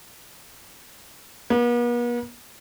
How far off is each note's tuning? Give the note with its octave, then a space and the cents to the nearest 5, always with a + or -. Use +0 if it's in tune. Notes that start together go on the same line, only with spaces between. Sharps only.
B3 -45